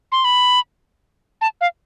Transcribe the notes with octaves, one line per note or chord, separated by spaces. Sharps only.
C6
B5
A5
F5